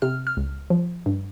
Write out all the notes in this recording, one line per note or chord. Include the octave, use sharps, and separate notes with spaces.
C3 F6
F6
C#2
F3
G2